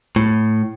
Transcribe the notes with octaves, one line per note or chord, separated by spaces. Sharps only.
A2